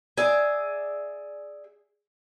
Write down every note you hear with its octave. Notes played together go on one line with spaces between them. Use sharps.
G#4 D5 E5